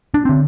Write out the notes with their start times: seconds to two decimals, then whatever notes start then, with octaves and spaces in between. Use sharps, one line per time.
0.14 D4
0.25 D3 C4